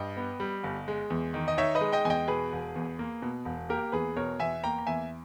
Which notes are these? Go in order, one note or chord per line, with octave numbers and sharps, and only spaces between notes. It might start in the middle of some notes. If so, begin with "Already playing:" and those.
Already playing: G2 D#5 G5
B3
G3
G1
G#3
E2
D#3
D#5
D#4 C#5 E5
B4 D#5
G#3
D#5 G5
E2 G#5
D#5 G5
B2 G#4 B4
E1
E2
A#3
B2
E1
A#3 G4 A#4
E2 G#4 B4
B2 A#4 C#5
E2 E5 G#5
A#3 G5 A#5
A#5
E2 E5 G#5